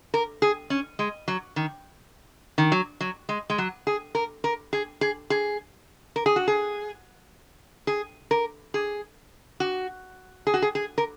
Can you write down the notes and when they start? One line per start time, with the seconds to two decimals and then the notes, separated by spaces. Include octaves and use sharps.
0.14 A#4
0.42 G#4
0.70 C#4
0.99 G#3
1.28 F#3
1.56 D#3
2.58 D#3
2.72 F#3
3.01 F#3
3.29 G#3
3.50 G#3
3.58 F#3
3.87 G#4
4.15 A#4
4.44 A#4
4.73 G#4
5.01 G#4
5.30 G#4
6.16 A#4
6.26 G#4
6.36 F#4
6.48 G#4
7.87 G#4
8.31 A#4
8.74 G#4
9.60 F#4
10.47 G#4
10.54 F#4
10.62 G#4
10.75 G#4
10.98 A#4